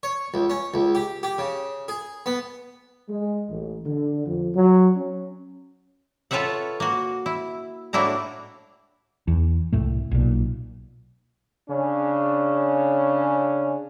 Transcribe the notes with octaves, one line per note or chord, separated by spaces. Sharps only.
C#5
C#2
C#4
C#2
G4
G4
C#3
G#4
B3
G#3
A1
D3
F2
F#3
C#4
F4 A4 B4 C#5 E5 F#5
A#3 F#4
E4
A2 A#3 D4 E4 F#4 A#5
E2
C2 A2 A3
B1 A#2
C#3 C#4 D4